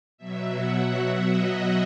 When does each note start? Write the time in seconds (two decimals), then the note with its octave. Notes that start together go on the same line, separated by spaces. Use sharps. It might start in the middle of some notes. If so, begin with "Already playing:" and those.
0.18 B2 F#3 E5
0.54 F#5
0.90 E5
1.26 D#5